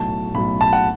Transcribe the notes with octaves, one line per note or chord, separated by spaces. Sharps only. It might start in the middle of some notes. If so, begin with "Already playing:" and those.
Already playing: B1 A2 F#3 A5
B1 A2 F#3 B5
A5
F#5